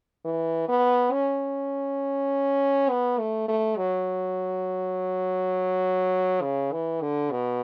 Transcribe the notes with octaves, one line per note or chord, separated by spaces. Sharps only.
E3
B3
C#4
B3
A3
A3
F#3
C#3
E3
D3
B2